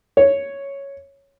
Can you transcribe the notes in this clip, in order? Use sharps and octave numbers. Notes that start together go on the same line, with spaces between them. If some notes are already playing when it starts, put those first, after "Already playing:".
C#5